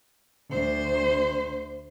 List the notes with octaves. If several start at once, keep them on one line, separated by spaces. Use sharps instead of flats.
D2 C5